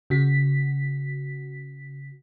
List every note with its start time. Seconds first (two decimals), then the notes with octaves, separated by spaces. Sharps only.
0.10 C#3 F#4 B6